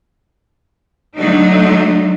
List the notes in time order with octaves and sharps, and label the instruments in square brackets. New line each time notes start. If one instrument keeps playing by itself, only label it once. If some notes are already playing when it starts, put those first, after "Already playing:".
[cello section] D3 F#3 A3 D4 D#4